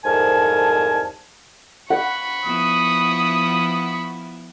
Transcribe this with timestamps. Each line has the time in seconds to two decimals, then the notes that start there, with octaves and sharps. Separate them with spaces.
0.04 C2 F2 G#2 A#4 G#5 A5
1.90 F#5 B5 C#6
2.44 F3 B3 E4 D#6